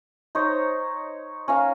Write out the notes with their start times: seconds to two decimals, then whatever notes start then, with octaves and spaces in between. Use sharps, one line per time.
0.35 D#4 C5 C#5
1.48 C#4 A#4 F5